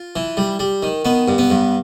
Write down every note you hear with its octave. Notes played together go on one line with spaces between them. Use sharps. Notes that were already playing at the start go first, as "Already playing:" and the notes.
Already playing: F4
E3
G3
G3
D#3
D#3 B3
G2
B3
G2